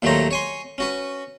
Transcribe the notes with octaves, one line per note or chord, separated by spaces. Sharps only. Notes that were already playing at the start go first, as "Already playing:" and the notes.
D#2 A#2 F#3 A3 C5 A#5
C#5 G#5 C6
C#4 F#4 B4